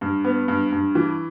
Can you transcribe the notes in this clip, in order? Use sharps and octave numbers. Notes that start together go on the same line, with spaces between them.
G2
B3
G2
G2
E3